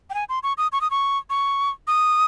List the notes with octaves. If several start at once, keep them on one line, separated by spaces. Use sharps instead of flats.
G5
G#5
C6
C#6
D#6
C#6
D#6
C#6
C#6
D#6